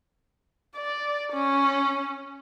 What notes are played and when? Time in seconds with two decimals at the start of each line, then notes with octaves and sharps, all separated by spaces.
0.76 D5
1.33 C#4